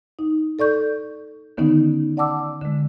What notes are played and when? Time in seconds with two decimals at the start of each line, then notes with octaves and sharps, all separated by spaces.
0.19 D#4
0.59 A4 D5 C#6 G6
1.57 D3 D#3 B3 C#4 D#4
2.17 D5 F#5 A5 D6 E6
2.61 D3 G#3